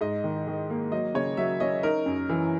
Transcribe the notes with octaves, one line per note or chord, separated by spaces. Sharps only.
G#2 D#5
D#3
D#3
A#3
F#3 D#5
C#3 C#5
F#3 E5
C#4 D#5
D#4 A#4
F#2
E3